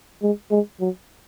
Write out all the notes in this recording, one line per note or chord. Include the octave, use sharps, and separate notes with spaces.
G#3
G#3
F#3